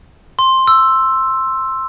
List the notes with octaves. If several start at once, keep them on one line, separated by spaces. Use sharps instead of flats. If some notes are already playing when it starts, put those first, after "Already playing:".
C6
E6